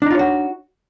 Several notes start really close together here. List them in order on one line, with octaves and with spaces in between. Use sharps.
D4 D#4 F4 C#5 F#4